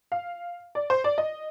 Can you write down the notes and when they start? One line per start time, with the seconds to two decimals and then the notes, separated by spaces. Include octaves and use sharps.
0.12 F5
0.75 D5
0.90 C5
1.04 D5
1.18 D#5